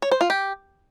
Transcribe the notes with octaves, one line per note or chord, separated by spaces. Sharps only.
C#5
C5
F4
G4